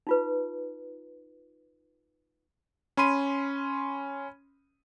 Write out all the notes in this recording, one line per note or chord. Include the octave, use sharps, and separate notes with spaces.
D#4 F4 B4
C#4 B5 C6 D#7